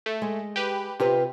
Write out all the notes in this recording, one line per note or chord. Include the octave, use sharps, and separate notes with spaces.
A3
G#3
G4 B4
C3 F4 G4 B4